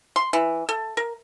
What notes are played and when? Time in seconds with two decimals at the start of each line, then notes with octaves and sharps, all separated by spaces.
0.16 C6
0.33 E3
0.69 A4
0.97 A#4